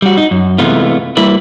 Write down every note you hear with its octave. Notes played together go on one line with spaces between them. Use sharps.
G3 F#4
D#4
F#2
C3 E3 G#3 A3 B3 F4
G3 A#3 E4 B4